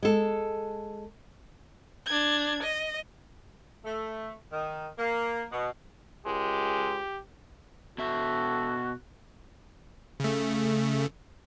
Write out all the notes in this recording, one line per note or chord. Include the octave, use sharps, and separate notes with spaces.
G#3 A4
D4 G#6
D#5
A3
D#3
A#3
B2
C#2 G#3 G4
B2 F#4 A4 E5
C#3 A3